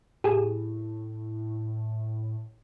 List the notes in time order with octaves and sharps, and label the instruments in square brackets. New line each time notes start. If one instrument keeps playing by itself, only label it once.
[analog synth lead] A2 [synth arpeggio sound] G4 G#4